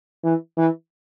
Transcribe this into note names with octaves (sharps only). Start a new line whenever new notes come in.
E3
E3